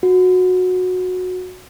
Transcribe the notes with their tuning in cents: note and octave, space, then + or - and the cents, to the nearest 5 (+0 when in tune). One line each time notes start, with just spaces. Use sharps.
F#4 -15